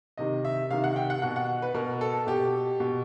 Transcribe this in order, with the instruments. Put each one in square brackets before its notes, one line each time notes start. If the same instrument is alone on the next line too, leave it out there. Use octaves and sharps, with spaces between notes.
[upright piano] C3 D#3 D#5
E5
C3 D#3 F5
F#5
G5
F#5
B2 F#5
F#5
B4
B2 A#4
A4
B2 G4
B2